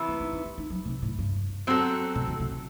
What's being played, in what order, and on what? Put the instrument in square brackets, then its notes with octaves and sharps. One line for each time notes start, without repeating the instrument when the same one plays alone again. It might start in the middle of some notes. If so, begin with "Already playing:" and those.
Already playing: [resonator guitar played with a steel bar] C3 E3 B3 E4
[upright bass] A3
D#4
D#4
E4
D#4
F#3
C3
A2
G2
[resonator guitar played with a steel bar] F#3 C4 F#4 A4
[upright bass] B2
D#3
C3
C3